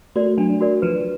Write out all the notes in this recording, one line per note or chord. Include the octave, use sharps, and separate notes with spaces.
A3 F#4 A#4 D5
F#3 D4
F#4 A#4 D5
F3 B4